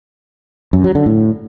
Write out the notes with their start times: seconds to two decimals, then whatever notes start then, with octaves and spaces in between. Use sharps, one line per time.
0.73 F#2
0.84 F#3
0.95 D3
1.06 A2